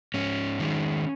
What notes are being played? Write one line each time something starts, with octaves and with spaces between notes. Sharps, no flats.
G#2 C#4
D#3 G#3